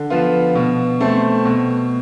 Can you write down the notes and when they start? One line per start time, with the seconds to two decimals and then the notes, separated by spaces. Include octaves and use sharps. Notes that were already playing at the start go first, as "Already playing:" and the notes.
Already playing: D3
0.10 F3 B3 F4
0.55 B2
1.00 A3 C4
1.45 B2